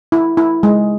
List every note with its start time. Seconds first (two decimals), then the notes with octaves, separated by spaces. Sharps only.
0.12 E4
0.37 E4
0.63 G#3